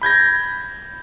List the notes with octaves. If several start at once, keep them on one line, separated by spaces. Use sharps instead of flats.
B5 G6 G#6 A#6